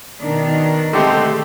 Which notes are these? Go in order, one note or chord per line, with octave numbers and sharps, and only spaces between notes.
B2 D#3 D4
D3 G#3 A3 C4 G4